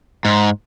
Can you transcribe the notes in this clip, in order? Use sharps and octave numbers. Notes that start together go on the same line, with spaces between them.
G#2